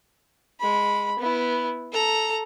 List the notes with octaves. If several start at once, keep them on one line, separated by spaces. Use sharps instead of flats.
G#3 B5
B3 E4
A4 A#5